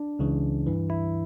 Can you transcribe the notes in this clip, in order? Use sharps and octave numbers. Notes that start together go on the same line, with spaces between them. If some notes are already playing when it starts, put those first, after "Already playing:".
Already playing: D4
C#2 C#3 E3
G2 E3
E4